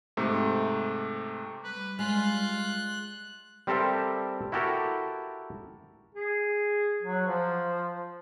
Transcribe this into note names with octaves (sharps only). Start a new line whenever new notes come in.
G#2 C3 A3
G3 B4
G#3 F4 F#6
G3 C4 G4 A4 A#4 E5
E4 F#4 G4 A4 A#4
G#4
F#3
F3